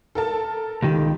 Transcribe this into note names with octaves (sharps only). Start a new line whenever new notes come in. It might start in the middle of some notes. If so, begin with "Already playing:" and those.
A4 A#4 A5
C#2 D#3 G4